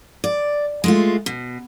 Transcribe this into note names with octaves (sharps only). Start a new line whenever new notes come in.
D5
G#3 A3 F4
B2